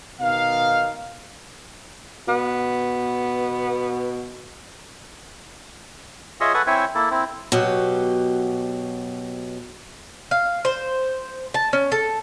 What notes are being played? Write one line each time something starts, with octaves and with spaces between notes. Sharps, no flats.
B2 D#3 D#4 F5
B2 B3
F4 G#4 C#5 D#5 E5
A4 B4 F#5 G#5 C#6
C4 E4 C#5 E5 G5 G#5
A#3 E4 A4
C4 E4
B2 F#3 G4
F5
C5
A5
C#4
A4